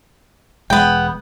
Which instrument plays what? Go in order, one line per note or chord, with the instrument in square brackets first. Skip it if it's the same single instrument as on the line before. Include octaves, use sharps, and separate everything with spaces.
[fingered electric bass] E1 G#3 [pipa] B3 G5